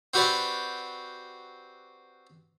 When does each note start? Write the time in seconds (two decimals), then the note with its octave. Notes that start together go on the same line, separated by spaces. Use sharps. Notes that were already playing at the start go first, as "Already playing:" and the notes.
0.14 C4 F#4 G4 B4 D5